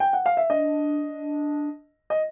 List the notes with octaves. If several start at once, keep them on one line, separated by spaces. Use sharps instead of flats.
G5
F#5
F5
E5
D4 D#5
D#5